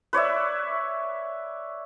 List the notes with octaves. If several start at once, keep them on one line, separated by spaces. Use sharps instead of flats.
B4 C#5 D5 E5